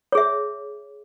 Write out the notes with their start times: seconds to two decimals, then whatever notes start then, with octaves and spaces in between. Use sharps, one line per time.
0.12 C#5
0.15 G#4
0.18 E5